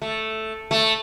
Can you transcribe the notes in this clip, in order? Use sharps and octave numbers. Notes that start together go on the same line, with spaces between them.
A3
A3